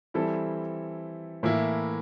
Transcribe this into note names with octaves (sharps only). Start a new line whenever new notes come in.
E3 G3 C4 E4 A4
A2 E3 A#3 E4